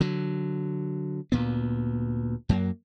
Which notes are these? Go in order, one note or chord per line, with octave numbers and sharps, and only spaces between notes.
D3 F#3
D2 A#2 B3
F#2 F#3 A#3